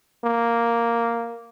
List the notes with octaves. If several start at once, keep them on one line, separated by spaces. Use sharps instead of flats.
A#3